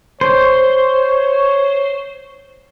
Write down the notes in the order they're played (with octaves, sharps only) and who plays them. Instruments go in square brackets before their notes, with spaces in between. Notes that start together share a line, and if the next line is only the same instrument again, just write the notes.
[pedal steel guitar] C5 [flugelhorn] C#5